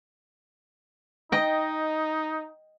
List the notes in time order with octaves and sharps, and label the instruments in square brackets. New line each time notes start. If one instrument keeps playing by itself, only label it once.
[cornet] D#4 [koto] D#5 G5